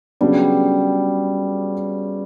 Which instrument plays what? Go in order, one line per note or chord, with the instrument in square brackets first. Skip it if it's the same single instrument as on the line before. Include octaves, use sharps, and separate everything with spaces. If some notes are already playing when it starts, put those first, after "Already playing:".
[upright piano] C#3 F#3 B3 D4 [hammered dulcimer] G3